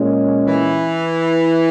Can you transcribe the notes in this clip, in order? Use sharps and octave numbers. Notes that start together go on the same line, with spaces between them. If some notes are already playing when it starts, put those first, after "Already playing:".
Already playing: A#2 G#3 C#4
E3